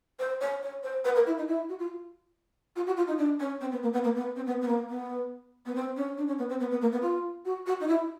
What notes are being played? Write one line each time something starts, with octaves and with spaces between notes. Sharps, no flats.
C5
C#5
C#5
C5
B4
A#4
E4
D#4
E4
F#4
F4
F4
F#4
F4
D#4
D4
C#4
C4
B3
A#3
B3
A#3
B3
C4
B3
B3
A#3
B3
B3
C4
C#4
D4
C#4
B3
C4
B3
B3
A#3
B3
F4
F#4
F#4
D#4
E4